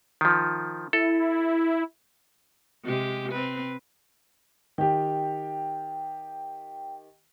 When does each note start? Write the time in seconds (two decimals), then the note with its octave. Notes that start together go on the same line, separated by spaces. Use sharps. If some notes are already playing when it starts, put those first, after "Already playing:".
0.21 D#3 F3
0.93 E4 A4
2.85 C3 G#3 G4
3.32 C4 B4
4.78 D#3 G4 G5